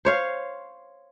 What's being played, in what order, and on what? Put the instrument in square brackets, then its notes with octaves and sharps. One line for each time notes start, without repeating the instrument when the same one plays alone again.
[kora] C5 C#5 F5